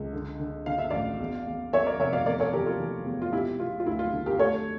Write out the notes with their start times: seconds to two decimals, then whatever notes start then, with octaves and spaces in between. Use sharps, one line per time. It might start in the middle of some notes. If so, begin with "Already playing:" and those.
Already playing: C#2
0.13 D3
0.40 D3
0.66 D3 F5
0.78 E5
0.90 A1 D5 F5
1.20 E2
1.46 E2
1.73 E2 C#5 E5
1.86 A#4 D5
2.00 F1 C#5 E5
2.13 D5 F5
2.26 E2 A#4 D5
2.40 A4 C#5
2.53 E3 G4 A#4
2.66 F4 A4
2.80 E3
3.06 E2
3.22 F4
3.32 E1 E4 G4
3.60 E1 F4
3.80 F4
3.86 D2 E4
3.99 F4
4.13 D3
4.26 G4 A#4
4.39 A3 A4 C#5